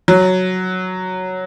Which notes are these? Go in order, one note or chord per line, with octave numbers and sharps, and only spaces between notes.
F#3